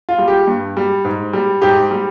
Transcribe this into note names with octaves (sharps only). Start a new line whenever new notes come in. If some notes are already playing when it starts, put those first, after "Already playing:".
F4
G3
G4
G2
G3
G#2
G3
G#2 G4
G3